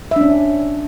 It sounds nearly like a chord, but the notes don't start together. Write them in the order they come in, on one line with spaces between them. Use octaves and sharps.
E5 D4 C#4